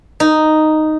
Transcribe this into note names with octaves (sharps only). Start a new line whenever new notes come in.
D#4